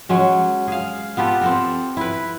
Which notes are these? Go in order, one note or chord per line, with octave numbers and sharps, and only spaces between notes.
F#3 G#3 C#4
G#4 F5
B3 F4 G4 A4
C4 A4 A#4
E4 B4